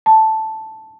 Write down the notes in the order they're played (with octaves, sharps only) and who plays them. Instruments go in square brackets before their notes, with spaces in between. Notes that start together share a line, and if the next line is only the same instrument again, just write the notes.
[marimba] A5